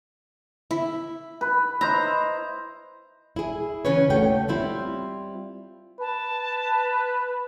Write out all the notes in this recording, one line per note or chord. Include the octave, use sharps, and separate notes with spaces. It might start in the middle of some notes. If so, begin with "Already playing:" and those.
E4
B4
E4 C5 D#5 A#5
E4 G#4
C#3 E3 C#4 B4 C#5
D#2 A3 F#4 C#5 G5
G3 C4 E4 F4
B4 A5